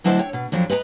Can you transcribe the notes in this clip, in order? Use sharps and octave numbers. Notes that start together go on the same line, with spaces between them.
D2 F#3 D4 E4 C5 D#5
C#5 G5
B2
F2 F3 F#3 D4
B4 D#5 G#5 A#5